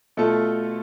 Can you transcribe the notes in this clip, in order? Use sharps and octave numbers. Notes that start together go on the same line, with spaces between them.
B2 A3 F4 A4